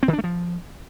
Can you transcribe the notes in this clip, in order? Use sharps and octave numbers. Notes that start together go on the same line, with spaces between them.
C4
D#3
D4
A3
F3